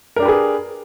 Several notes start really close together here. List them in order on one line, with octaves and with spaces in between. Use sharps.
A#4 D4 G4 B4 G#4